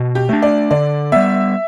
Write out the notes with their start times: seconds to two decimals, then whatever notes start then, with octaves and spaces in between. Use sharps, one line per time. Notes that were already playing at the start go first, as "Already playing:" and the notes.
Already playing: B2
0.15 G4
0.29 A3 D4
0.42 D5
0.71 D3 D5
1.12 G3 B3 E5